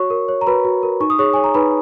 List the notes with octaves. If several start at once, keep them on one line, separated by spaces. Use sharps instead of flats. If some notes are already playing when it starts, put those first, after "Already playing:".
Already playing: F#4 C#5 C#6
A#4
C#5
A#5
F#4 B4 B5
F#4
A#4
D#4 C#6
D#6
G#4 C#5 C#6
C#5 G#5
A#5
D#4 B4 B5